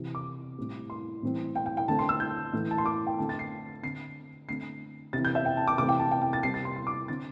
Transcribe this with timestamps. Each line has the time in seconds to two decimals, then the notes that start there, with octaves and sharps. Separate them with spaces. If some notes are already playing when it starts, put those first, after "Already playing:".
Already playing: C3 E3 C4
0.15 D6
0.58 A2 G3 C4
0.90 C6
1.23 A2 E3 G3 C4
1.55 G5
1.66 G5
1.77 G5
1.88 D3 A3 C4 A5
1.99 C6
2.09 E6
2.20 G6
2.53 A2 E3 A3
2.71 A5
2.78 C6
2.86 D6
3.07 G5
3.18 D3 A3 C4 A5
3.29 A6
3.39 C7
3.83 D3 C4 C7
4.48 D3 A3 C4 C7
5.13 C3 E3 C4 A6
5.25 G6
5.35 E5
5.45 G5
5.57 A5
5.68 D6
5.78 C3 E3 A3 C4 D6
5.89 G5
6.00 A5
6.11 G5
6.22 G5
6.33 A6
6.43 C3 G3 C4 C7
6.54 A6
6.65 C6
6.76 C6
6.87 D6
7.08 D3 C4 A6